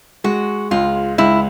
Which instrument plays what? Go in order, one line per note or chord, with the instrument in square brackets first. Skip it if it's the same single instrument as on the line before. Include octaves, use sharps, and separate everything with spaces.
[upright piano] G#3 [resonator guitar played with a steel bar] F#4
[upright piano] C#2 [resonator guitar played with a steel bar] F4
[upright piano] C#2 [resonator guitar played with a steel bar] E4